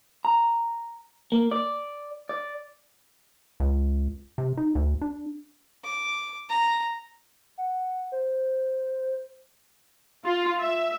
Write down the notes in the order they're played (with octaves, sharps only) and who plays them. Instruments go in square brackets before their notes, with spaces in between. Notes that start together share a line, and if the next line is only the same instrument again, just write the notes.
[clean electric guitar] A#5
A#3
D5
D5
[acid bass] C#2
C3
D#4
D2
D4
[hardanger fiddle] D6
A#5
[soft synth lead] F#5
C5
[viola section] F4
E5